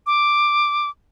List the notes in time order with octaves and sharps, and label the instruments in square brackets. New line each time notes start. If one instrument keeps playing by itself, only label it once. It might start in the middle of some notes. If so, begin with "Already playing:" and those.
[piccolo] D6